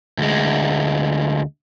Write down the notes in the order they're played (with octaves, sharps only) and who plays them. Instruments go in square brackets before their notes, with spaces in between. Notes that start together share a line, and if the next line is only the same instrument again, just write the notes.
[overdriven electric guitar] D2 G#3